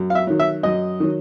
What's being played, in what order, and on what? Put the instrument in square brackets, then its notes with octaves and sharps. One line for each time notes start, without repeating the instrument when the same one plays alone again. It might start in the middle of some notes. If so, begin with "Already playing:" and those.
Already playing: [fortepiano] F#2
F5
E5
D#3 F#3
E5
F#2 D#5
D#3 F#3